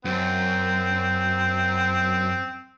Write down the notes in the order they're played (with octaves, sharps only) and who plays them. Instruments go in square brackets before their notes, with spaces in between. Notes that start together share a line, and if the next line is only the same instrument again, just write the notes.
[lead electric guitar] F#2 [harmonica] C4